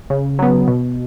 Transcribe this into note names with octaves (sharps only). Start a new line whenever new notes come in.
C#3
F#3 B3
B2